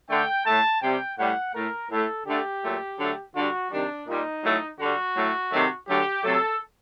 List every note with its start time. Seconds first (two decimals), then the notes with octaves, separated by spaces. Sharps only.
0.10 D3 A3 G5
0.46 A2 A3 A5
0.82 C3 G3 G5
1.18 A2 G3 F#5
1.54 A2 A3 A#4
1.90 A2 A3 A4
2.27 D3 A3 G4
2.63 A#2 F#3 A3
2.99 D3 F#3 A3
3.35 D3 G3 F#4
3.71 C3 D#3 G3 D4
4.07 A#2 G3 D#4
4.44 A2 F#3 A3
4.79 D3 G3 F#4
5.16 A2 F#3 A3
5.52 C3 D#3 F#3 A3
5.88 D3 F#3 A3 G4
6.24 C3 F#3 A3 A4